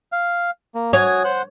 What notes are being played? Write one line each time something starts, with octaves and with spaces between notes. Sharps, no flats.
F5
A#3
F#4 C#5 G#5 D#6
C5 F#5 F#6